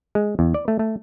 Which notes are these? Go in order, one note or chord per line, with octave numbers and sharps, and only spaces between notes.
G#3
E2
D5
A3
A3